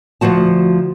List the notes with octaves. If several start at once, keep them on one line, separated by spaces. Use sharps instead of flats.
D2 B2 F3 F#4 A5